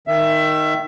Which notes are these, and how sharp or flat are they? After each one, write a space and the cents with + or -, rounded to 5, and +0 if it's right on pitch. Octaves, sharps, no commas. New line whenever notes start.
D#3 +0 E5 +20